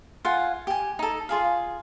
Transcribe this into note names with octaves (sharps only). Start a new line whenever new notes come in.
F4 F5 F#5 G#5
G4 G#5
D#4 A4
F4 G#4 F5